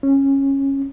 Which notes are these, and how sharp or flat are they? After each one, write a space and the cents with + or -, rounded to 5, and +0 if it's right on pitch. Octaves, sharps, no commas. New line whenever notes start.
C#4 -15